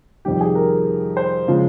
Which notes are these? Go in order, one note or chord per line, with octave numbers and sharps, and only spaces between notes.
F2 C3 D#3 G3 G4
G#4
A#4
C5
C#3 F3 G#3